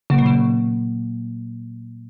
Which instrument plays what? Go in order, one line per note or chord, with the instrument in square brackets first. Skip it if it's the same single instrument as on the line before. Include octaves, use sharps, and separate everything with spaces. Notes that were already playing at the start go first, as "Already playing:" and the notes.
[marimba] A#2 F#3 A#3 [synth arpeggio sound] C#3
[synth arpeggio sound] B2
C#3